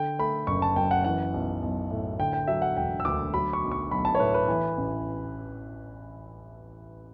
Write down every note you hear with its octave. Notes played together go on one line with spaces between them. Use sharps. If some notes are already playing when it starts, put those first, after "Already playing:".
Already playing: D3 G5
A3 B5
F#1 C#6
A5
F#2 G5
F#5
E3 F#5
B1
B1
A2
D3 G5
G5
F#3 E5
F#5
E1 G5
E6
D2 D6
F#3 B5
C#6
B1
C#6
B1 B5
A5
C#5
A2 B4
B4
E3
A1